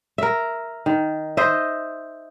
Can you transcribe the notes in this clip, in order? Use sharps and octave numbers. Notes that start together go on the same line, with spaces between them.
A#4 E5
D#3
C5 D#5 E5